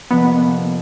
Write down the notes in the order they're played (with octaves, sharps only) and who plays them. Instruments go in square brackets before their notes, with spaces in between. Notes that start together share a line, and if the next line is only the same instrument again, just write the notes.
[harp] F2 C3 F3 A#3 D#4 [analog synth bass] B3